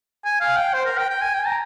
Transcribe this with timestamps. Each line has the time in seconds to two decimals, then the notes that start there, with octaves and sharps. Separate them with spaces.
0.25 G#5
0.40 F5
0.56 G5
0.73 C5
0.85 A#4
0.98 G5
1.10 G5
1.21 G#5
1.34 G5
1.46 A#5